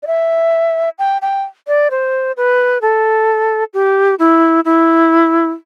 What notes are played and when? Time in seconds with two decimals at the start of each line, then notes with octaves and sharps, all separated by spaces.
0.03 D5
0.07 E5
0.99 G5
1.22 G5
1.67 D5
1.91 C5
2.37 B4
2.82 A4
3.74 G4
4.19 E4
4.65 E4